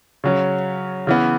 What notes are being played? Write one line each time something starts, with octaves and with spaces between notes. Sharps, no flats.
C#3 F#3 C#4
C#3 E3 B3